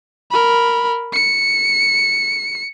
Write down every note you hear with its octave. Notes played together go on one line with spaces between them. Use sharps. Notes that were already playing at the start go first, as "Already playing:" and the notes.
A#4 B5
C#7